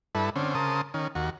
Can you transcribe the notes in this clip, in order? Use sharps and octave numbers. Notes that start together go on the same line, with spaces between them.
G2 E4 A4 B4
D3 C4 C#4
C#3 A#4 C5 A5 D#6
D#3 C#4
D#2 F#4